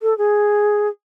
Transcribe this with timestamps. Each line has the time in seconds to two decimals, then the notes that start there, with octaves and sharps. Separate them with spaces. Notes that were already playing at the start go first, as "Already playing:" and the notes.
0.02 A4
0.18 G#4